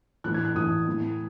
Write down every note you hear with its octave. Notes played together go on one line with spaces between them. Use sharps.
A2 E3 F#6
G#6
F#6
A2 E3 D#6
A2 E3